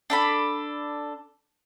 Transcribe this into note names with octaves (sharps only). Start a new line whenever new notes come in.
D4 A4 B5